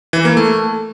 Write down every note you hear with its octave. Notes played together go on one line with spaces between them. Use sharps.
E3
A#3
A3